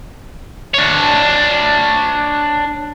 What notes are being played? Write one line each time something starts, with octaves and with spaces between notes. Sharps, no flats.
D4 C#5